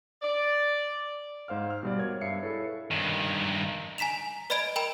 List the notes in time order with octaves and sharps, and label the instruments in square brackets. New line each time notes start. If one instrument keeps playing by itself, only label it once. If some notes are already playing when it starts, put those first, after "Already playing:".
[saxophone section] D5
[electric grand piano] G#2 C5 F5 F6
F6
B2 G3 D5
A#4 C#5 G#6
G2 E5 F5 C7 C#7
E4 G#4 A4 B4 C#5
[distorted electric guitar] G2 D#3
[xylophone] G#5 A#5 B6 E7 F7
B4 D5 D#5 B5 G#6 D7
A#4 G5 A#5 B5 D7